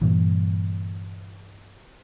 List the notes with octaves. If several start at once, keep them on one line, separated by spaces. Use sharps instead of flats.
G2 A#2 E3